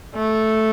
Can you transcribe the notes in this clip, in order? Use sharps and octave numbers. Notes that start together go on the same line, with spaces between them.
A3